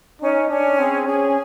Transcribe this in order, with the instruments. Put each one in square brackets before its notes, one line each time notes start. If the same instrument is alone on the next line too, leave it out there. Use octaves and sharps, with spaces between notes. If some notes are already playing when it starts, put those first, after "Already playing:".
[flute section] C#4 [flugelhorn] D#4
[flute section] C#4 [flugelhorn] D4
[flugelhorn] C4 [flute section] G#4
[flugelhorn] C#4 [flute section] G#4